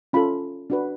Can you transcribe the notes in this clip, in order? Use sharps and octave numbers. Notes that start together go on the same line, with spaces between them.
C#4 F4 A4 B5
D4 F#4 B4